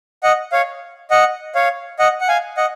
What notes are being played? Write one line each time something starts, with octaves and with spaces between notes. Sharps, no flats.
D#5 F#5
C#5 F5
D#5 F#5
C#5 F5
D#5 F#5
F#5
F5 G#5
D#5 F#5